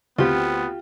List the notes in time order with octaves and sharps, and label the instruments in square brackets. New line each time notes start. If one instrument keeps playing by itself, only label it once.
[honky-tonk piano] D2 C4 [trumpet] B3 [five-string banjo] F4 G4